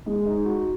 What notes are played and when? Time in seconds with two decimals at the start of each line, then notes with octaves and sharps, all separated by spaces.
0.06 G#3
0.26 D#4
0.45 F#4